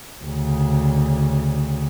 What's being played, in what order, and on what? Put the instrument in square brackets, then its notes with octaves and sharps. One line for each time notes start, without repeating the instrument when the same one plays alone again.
[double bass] D2 C#3